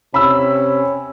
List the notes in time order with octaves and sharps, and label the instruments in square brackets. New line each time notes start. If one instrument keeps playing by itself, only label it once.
[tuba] C3 [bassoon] C#4 [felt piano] B5 E6